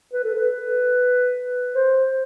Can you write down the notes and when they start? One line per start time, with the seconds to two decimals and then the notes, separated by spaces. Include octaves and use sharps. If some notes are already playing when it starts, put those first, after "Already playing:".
0.13 B4
0.24 A4
0.35 B4
1.75 C5